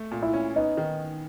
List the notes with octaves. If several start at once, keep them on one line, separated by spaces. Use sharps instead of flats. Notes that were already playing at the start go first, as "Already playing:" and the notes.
Already playing: A3
A#2
E4 E5
C#4
B3 D#4 D#5
D#3